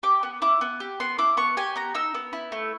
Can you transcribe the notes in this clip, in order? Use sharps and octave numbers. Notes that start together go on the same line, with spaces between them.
G4 D6
B3
E4 D6
B3
G4
B3 C6
E4 D6
B3 C#6
G4 G#5
B3 A#5
D#4 E6
B3
E4
A3